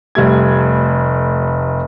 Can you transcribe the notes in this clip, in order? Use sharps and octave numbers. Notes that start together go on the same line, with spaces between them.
F1 G3 A3 G#6